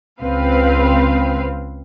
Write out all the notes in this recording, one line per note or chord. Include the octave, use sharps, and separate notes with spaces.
C#2 C4 B4 F5